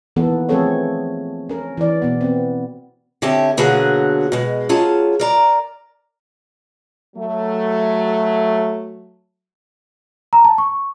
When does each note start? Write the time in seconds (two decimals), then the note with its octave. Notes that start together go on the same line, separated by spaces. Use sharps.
0.16 D#3 E3 A#3 B3 A4
0.49 F3 A3 C4 G#4 A4 C#5
1.49 C#4 A#4
1.77 E3 D5
2.02 B2 B3
2.21 B3 C4
3.22 D3 C4 C#4 G4 E5 A5
3.57 B2 D3 F#3 A#3 F#4 G#4
4.32 B2 G#3
4.69 F#3 C#4 F4 G#4 A5
5.20 A#4 D5 A#5
7.17 F#3 A3
10.33 A#5
10.45 A5
10.58 C#6